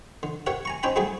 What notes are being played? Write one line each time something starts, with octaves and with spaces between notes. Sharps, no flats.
D3
G4 A#4 C#5 E5 F#5
G#5 A#5 C#6
C4 C#4 D#4 G5 G#5 B5
F#3 G3 A3 G4 G#4